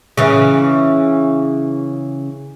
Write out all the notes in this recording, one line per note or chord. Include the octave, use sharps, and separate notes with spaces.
C#3 E3